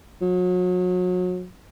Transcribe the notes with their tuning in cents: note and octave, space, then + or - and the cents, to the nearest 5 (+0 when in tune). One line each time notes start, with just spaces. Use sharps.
F#3 -35